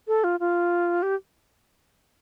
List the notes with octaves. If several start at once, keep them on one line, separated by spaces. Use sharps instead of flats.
A4
F4
F4
G4